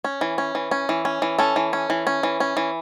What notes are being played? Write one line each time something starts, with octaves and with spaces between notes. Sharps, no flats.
C#4
E3
C#4
E3
C#4
E3
C#4
E3
C#4 A4
E3
C#4
E3
C#4
E3
C#4
E3